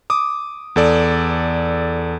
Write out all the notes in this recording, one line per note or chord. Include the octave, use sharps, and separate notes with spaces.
D6 D#6
E2 A4 D5